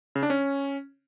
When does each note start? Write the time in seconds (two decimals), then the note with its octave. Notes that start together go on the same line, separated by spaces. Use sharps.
0.15 C#3
0.23 D4
0.30 C#4